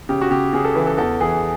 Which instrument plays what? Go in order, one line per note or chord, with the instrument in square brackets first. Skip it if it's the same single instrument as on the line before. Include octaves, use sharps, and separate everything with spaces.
[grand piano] C#3 G4
F#4
C#3 G4
C#3 G#4
A4
E3 B4
A4
E2 A4
E3 G#4